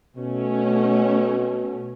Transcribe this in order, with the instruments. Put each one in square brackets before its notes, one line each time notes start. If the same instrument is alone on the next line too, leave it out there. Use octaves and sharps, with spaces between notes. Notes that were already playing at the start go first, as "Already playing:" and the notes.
[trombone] B2 [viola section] A3 C#4